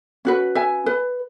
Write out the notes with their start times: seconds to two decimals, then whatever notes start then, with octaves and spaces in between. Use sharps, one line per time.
0.25 C#4 F#4 B4
0.55 E5 G#5
0.86 B4